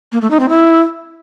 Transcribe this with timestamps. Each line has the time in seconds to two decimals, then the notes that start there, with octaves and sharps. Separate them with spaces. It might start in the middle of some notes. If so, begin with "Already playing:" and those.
0.12 A#3
0.21 A3
0.31 D#4
0.40 C4
0.49 E4